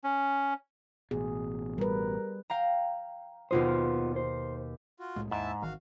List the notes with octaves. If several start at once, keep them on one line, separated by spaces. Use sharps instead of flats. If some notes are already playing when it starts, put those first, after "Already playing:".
C#4
A1 B2 G#4
G3 A#4 B4
F5 G5 A#5
D#2 B2 B3 F4 C5 D#6
C5
F4 F#4
C2 A2 G#3
D#2 G#2 E4 E5 A5
G#1 D#3 E3 F#4 F5